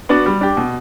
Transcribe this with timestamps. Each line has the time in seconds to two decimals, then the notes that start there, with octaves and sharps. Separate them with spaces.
0.09 B3 D4 F#4
0.26 G3
0.41 D4 G4
0.57 B2